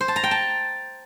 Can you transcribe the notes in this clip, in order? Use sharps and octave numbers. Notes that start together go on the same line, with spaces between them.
C5
A5
A#5
G5
A5